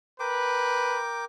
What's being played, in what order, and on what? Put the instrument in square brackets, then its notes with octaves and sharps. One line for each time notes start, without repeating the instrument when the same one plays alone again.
[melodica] A#4 G5 D6 [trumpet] B4